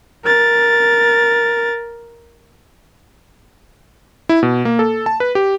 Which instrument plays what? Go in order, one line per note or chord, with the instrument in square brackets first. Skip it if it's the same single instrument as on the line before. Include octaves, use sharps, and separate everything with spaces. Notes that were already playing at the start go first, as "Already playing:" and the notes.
[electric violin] A#4 A6
[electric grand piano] E4
B2
A#3
A4
A5
B4
G4